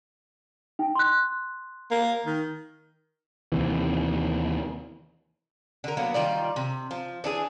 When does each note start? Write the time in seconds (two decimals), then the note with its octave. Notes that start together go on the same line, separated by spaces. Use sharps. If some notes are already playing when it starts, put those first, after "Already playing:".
0.79 D#4 G5
0.95 C6 F#6
1.91 A#3
2.26 D#3
3.52 D#2 C3 E3
5.84 D3 A#4
5.97 F#3 A#3 B3 F#4
6.14 D#3 G3 F4 D5
6.56 C3
6.91 F3
7.24 E3 D4 G#4